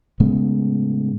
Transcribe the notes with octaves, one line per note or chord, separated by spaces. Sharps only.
A2 C#3 G#3 B3